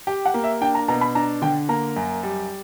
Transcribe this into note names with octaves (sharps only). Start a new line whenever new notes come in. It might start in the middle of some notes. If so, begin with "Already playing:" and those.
G4 G5
F#5
A#3
E5
D4 G5
A#5
B2 A#5
B5
D4 A#5
D3 G5
A#3 A#5
F#2
G3